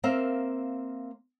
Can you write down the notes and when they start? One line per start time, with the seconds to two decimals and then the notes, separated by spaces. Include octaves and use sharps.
0.04 A#3 C4 A#4 E5 F5